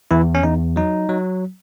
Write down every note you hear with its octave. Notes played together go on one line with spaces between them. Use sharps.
E2 E3 E4
C#4
E2 D#4
F#3 D#4
F#3